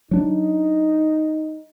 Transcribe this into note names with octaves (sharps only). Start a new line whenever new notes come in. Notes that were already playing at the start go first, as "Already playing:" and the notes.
F#3 D4 D#4